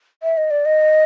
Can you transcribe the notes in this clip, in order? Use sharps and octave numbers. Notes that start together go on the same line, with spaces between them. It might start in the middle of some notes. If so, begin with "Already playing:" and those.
E5
D#5
D5
D#5